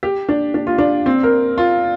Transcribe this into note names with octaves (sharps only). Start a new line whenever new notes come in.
G4
D4
D4
F4
D4
C4
A#4
F4